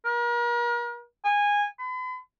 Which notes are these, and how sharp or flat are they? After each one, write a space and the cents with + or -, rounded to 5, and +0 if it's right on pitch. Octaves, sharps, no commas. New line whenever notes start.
A#4 +40
G#5 -15
B5 +40